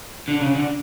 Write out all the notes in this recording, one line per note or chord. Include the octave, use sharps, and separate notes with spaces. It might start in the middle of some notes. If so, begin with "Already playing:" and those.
D3
C#3
D3